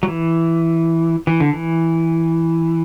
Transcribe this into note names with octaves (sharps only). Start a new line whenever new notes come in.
F#3
E3
E3
D3
E3